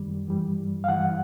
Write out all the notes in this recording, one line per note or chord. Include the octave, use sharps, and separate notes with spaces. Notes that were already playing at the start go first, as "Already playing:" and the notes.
Already playing: F#2 D#3 G3
G2 E3 G3
F5
G2 E3 G3 F#5